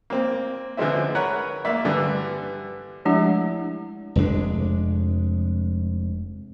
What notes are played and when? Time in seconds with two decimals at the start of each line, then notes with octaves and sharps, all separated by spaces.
0.10 A#3 C4
0.77 D3 E3 F3 G#3 C4 E4
1.15 A#4 B4 C#5 F#5
1.65 A#3 D5 E5
1.85 G2 D3 E3 G3
3.05 F3 G#3 A3 D4 E4 G4
4.16 F1 F2 G#3 D4